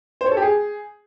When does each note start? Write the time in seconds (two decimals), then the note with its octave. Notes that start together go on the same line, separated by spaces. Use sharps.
0.21 C5
0.26 C#5
0.32 A4
0.37 G4
0.42 G#4